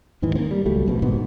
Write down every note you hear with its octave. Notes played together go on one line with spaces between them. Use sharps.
D#2 G#2 D#3 E3
A#3 C4
G3
C#2 F#3 G3 A3
D#1 A#1 B2
D#1 G#2 B2 B3